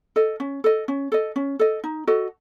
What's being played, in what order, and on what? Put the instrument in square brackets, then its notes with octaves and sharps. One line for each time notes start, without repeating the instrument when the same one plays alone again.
[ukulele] A4 D#5
C#4
A4 D#5
C#4
A4 D#5
C#4
A4 D#5
D#4
F#4 A4 D#5